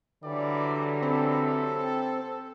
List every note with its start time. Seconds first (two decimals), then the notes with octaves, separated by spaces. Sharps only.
0.24 D3 E3 F#3 G3 D5
1.03 C4 A4